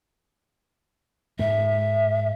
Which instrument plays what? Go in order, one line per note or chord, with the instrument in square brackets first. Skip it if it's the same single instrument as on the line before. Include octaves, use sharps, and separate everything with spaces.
[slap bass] G#2 G#3 [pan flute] E5